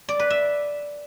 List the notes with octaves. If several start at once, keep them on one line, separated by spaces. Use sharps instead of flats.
D5
B4
E5